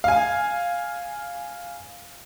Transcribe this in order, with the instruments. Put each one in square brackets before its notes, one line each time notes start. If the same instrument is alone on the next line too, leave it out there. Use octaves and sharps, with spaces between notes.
[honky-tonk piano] F5 G#5